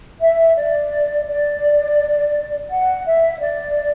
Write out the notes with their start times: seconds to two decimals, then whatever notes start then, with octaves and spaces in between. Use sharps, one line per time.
0.21 E5
0.56 D5
1.29 D5
2.71 F#5
3.06 E5
3.41 D5